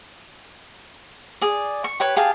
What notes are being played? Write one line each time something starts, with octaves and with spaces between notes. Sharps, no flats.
G#4 D5
C#6
G4 B4 C#5
G4 G#4 F5 A5